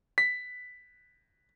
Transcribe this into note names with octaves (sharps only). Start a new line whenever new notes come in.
B6